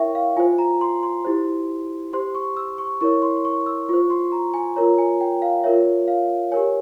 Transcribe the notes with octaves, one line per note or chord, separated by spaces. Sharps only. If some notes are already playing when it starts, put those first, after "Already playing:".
Already playing: E4 A#4 C#5 E5 G5 C#6
F5
F4 C5 G#5
A#5
C6
C6
E4 G4 C5
G4 C5 C6
C#6
E6
C#6
E4 A#4 C#5 C#6
C6
C#6
E6
F4 C5 C#6
C6
A#5
G#5
F4 A#4 C#5 A#5
G#5
G5
F5
F4 A#4 C#5 E5
F5
G4 A#4 C#5 G#5